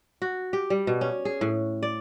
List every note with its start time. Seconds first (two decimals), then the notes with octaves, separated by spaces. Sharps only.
0.22 F#4
0.53 G4
0.70 G3
0.87 B2
1.01 C#4
1.25 G#4
1.41 A2
1.83 D5